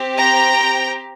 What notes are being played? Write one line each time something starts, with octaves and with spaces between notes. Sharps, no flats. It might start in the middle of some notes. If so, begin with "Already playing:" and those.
Already playing: C4 G4
G5 A#5